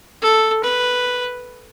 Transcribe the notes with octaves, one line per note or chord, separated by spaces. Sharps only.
A4
B4